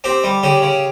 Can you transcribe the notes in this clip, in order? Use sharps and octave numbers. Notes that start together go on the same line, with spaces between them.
C4 G4
G3
C#3 G4
C#3